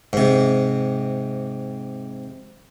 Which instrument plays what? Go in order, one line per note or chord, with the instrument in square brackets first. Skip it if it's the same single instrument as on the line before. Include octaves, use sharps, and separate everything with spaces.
[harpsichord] G#2 C3